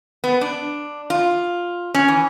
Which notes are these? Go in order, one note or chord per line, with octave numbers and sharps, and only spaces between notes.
B3
D4
F4
C#4
E3